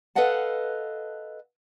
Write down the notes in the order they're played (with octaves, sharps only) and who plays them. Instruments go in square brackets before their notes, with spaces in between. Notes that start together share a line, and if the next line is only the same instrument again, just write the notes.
[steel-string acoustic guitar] A4 B4 D#5 F5 F#5 A5